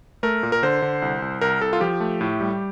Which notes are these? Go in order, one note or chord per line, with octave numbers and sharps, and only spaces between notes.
A3 A#4
A#2
A#4
D3 C5
D3
C2
C2
C2 A#4
C2 A4
F4
F3 G4
A3
A2
G3